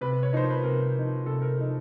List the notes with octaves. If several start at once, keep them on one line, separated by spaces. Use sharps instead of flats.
C3 B4
C#5
F3 A#3 D#4 C5
B4
C3 A#4
F3 A#3 D#4
C3 A4
A#4
F3 A#3 D#4